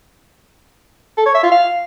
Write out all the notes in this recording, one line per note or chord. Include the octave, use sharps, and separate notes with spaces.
A4
C#5
E5
F4
F5